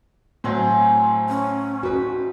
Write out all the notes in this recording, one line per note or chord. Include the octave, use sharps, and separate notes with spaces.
A2 F#3 C4 C5 G#5
C#4 D#6
D#4 F#4 B4 D5